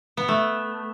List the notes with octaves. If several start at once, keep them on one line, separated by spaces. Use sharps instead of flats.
B3
A3